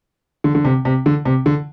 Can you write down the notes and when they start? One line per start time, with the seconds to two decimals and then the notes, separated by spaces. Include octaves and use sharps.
0.44 D3
0.55 D3
0.65 C3
0.85 C3
1.06 D3
1.25 C3
1.46 D3